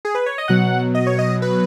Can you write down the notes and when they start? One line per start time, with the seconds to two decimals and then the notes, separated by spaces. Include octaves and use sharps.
0.05 G#4
0.15 B4
0.26 C#5
0.38 D#5
0.48 B2 F#3 F#5
0.95 D#5
1.07 C#5
1.19 D#5
1.42 B4